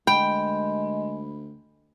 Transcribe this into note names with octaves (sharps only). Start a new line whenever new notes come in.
D2 G#3 G5 B5